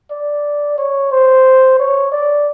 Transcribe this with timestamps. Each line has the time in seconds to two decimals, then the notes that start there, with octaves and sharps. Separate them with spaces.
0.11 D5
0.78 C#5
1.11 C5
1.79 C#5
2.12 D5